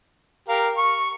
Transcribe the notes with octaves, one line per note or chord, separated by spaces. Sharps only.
G4 A#4 F5
C#6